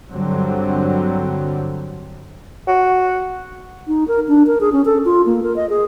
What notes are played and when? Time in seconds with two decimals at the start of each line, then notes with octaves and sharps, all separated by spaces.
0.12 G2 D3 F#3 G3 C4
2.68 F#4
3.88 D#4
4.08 A#4
4.28 D4
4.47 A#4
4.61 G#4
4.73 C#4
4.85 A4
5.05 F4
5.26 A#3
5.43 A#4
5.56 D#5
5.70 G#4